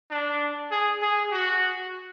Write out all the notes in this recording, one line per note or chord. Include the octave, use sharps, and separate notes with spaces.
D4
G#4
G#4
F#4